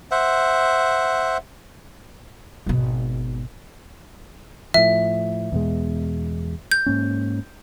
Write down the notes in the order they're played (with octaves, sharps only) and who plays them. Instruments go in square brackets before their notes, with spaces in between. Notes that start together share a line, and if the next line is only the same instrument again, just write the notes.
[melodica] C5 E5 F#5
[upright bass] G#1 B2
[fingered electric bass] A2 F3 [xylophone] E5
[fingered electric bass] E2 B2 G#3
[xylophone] G6
[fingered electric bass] G#2 A#3 C#4